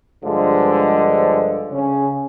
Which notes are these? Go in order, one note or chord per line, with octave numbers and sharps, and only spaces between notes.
G2 D3 F3 G#3
C#3 C#4